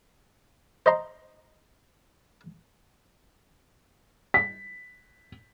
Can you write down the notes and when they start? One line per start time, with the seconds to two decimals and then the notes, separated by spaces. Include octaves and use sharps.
0.86 C5 D#5 A#5 C6
4.34 B6